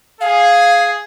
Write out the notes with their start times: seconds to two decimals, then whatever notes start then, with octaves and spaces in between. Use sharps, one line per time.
0.21 G#4 F5